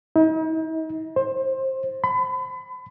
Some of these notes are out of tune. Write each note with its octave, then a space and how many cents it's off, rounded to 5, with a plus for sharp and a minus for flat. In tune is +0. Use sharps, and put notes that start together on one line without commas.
D#4 +45
C5 +20
B5 +35